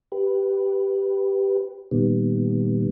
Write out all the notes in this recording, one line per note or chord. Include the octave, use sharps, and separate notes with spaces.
G4 B4
A#2 D#3 G3 B3